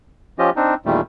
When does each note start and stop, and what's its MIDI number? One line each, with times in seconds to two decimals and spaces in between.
0.39 0.50 53
0.39 0.50 61
0.39 0.50 65
0.39 0.50 67
0.39 0.50 75
0.56 0.74 60
0.56 0.74 62
0.56 0.74 63
0.86 1.01 40
0.86 1.01 46
0.86 1.01 51
0.86 1.01 55
0.86 1.01 57